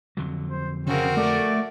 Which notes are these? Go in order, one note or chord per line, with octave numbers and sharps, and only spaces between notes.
F2 D3 F#3
C5
C#3 C4 F#4 A#4
A3 D5